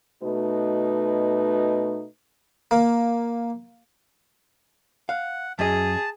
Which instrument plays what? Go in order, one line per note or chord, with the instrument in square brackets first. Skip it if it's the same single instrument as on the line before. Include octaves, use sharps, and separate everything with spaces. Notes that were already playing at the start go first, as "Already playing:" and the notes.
[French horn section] B2 A3 D#4 F#4 B4
[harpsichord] A#3
[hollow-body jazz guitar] F5 [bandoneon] F#5
[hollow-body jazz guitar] F#2 D#5 [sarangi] G#4 [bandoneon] A5